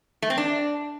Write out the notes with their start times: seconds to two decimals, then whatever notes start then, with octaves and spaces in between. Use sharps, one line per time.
0.22 A3
0.30 C4
0.38 D4